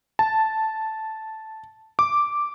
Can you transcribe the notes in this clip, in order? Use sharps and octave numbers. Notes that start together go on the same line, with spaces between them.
A5
D6